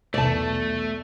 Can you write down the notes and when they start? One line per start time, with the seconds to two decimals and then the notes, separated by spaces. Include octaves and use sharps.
0.14 B1 E2 A3 D5 A5